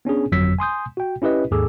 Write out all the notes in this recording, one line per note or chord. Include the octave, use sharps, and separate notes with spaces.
B3 C#4 D4 G#4
G1 F2 F#3 E6 B6
G#5 C6 D#6 G6
F#4 G5
C#4 E4 G4 B4 D#5
D#2 G#2 G#4 A4 D6 E6